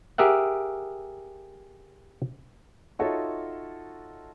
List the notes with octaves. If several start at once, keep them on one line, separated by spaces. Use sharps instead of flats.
G4 G#4 A#4 E5 F#5
D#4 F4 F#4 A4 C#5 E5